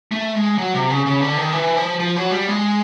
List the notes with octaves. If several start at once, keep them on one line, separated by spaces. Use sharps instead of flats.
A3
G#3
F#3
C3
C#3
C#3
D3
D#3
E3
F3
F3
F#3
G3
G#3